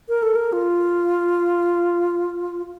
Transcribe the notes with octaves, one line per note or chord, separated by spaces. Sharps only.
A#4
A4
A#4
F4